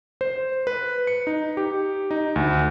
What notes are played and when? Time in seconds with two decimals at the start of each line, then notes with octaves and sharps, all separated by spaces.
0.21 C5
0.67 B4
1.07 C#7
1.27 D#4
1.57 G4
2.11 D#4
2.36 D2